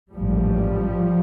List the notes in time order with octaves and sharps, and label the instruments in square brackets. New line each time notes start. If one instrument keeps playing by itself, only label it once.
[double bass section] A1 G#2 F3 G3